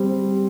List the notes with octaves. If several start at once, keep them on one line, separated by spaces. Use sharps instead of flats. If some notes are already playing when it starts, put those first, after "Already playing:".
Already playing: G3 C4